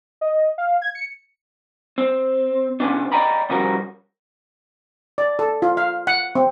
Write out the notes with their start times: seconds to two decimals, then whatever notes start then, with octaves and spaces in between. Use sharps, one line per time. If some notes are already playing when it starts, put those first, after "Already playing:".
0.21 D#5
0.58 F5
0.82 G#6
0.95 C#7
1.98 C4
2.80 G#2 C3 G#3 B3 C#4 D4
3.12 D5 D#5 F5 G5 A#5 B5
3.50 C3 F3 G3 C#4 F#4 A#4
5.18 D5
5.39 A4
5.62 F4
5.77 F5
6.07 F#5
6.35 C4